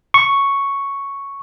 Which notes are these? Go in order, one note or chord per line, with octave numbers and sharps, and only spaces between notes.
C#6